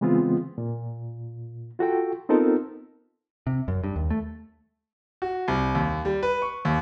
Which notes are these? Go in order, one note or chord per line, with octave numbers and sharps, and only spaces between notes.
C#3 E3 G#3 B3 C4 F4
A#2
F4 F#4 A4 G5
B3 C4 D#4 F4 A4 A#4
C3
F#2
G2
D#2
A3
F#4
C2
D#2
G3
B4
C#6
D#2